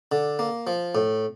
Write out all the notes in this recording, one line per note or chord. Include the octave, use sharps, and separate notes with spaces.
D3
A#3
F3
A2